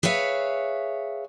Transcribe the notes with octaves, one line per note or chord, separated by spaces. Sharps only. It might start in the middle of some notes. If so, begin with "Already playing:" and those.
G#4 B4 C#5 E5 F5